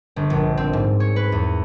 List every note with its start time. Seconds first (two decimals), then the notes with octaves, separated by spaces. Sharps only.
0.16 G1
0.30 A#1
0.57 C4
0.73 G#2
1.00 C#5
1.16 B4
1.32 E2